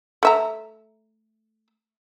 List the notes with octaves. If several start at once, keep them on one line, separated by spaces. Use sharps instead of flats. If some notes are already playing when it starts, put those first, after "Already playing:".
A3 E5 A#5